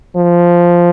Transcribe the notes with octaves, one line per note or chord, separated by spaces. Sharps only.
F3